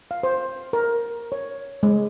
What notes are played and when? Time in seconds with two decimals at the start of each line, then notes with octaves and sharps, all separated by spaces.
0.11 F5
0.23 C5
0.73 A#4
1.32 C#5
1.83 G#3